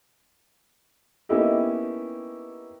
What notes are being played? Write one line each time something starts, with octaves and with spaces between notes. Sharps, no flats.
A#3 B3 C#4 D#4 E4 G4